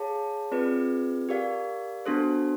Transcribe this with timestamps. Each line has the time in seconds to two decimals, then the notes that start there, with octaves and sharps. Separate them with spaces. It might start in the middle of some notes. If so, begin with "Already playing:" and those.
Already playing: G#4 C#5 F5 A5
0.51 C4 F4 G#4 B4 D5
1.29 G4 A#4 D5 F5
2.06 B3 D4 F#4 A4 C5